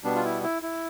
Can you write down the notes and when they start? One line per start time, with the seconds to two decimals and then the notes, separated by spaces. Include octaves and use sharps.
0.04 B2 G3 B3 D4
0.15 F4
0.24 E4
0.43 E4
0.62 E4